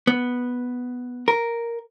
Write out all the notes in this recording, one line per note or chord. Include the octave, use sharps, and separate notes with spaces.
B3
A#4